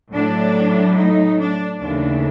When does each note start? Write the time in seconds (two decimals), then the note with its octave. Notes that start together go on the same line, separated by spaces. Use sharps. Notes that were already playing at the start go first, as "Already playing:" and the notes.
0.12 A2 F#3 A3 D4
0.97 D#4
1.38 D4
1.80 D#2 C#3 E3 A3 D4